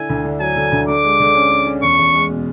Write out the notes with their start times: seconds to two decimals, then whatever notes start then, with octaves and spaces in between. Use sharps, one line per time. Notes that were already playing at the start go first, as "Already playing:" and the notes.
Already playing: D3 E4 G#5
0.09 D2
0.25 D3
0.40 F#3 G#5
0.56 D3
0.72 D2
0.88 D3 D6
1.04 G#3
1.20 D3
1.35 C#4
1.51 C#4
1.66 C#4
1.82 E2 C#6
1.99 E2
2.14 G#3
2.30 B2